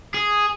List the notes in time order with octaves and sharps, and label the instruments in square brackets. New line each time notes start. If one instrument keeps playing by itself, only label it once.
[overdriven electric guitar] G#4